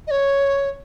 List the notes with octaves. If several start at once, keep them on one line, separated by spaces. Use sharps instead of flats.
D#5
C#5